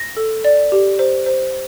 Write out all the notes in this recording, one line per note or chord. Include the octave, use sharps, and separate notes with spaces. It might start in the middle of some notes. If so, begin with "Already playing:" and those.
Already playing: A#6
A4
D5
G4
C5
C5